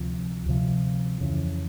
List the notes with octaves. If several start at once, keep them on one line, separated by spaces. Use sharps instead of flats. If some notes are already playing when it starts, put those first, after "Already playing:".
Already playing: D2 C3 F3
D2 C3 F3
F2 C#3 E3